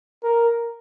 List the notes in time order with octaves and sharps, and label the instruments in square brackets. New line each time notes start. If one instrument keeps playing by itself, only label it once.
[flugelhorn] A#4